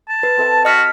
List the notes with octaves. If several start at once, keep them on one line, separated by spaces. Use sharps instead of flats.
A5
B4 E6
C4 A4 E5
F#4 D#5 F6 B6